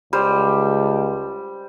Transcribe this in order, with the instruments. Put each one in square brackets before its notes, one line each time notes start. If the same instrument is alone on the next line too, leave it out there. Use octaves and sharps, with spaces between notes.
[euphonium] C#2 [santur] G3 C5